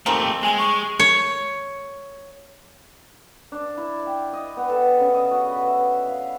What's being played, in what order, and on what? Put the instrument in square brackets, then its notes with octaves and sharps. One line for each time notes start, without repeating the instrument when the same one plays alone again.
[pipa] D#3 F3 C4 [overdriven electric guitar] A3 G4
[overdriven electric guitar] G#3 [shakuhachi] G#5
[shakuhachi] C#6
[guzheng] C#5
[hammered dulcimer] D4
E4
G5
D#5
B3
A4
C#3
D#5
F#4
B4
E5
F5